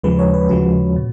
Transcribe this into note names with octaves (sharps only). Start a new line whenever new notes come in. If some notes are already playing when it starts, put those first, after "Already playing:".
D#2 C#3 F3 G#3 B4
C#5
B4
D#2 C#3 F3 G#3 F#4
A#2